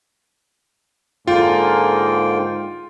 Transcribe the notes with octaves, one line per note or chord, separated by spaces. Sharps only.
G#2 D3 A#3 F4 G#4 A#4 G5